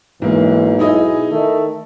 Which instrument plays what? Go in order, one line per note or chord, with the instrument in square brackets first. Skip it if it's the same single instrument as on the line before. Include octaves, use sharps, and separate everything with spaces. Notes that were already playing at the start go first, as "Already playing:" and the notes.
[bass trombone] B1 [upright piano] G#2 A#3 [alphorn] E3
[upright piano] D#4 E4 D#5 [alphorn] G#4
[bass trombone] D#3 [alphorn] A3